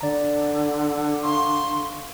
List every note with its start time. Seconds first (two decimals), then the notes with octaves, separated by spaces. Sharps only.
0.01 D3 D5 A#5
1.23 F5 C6 C#6